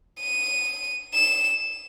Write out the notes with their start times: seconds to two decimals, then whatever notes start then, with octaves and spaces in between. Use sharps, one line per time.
0.20 D#7
1.15 E7